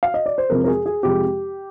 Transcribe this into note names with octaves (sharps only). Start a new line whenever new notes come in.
F5
D#5
D5
C5
F2 C3 F3 G#3 A#4
A#4
G#4
G#4
F2 C3 F3 G#3 G4